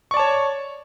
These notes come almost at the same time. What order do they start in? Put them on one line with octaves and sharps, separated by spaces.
C#6 D5 A5 C#5